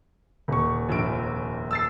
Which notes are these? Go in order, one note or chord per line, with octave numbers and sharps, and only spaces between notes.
D#1 C#6
F1 A#1 D7
E6 A6 C7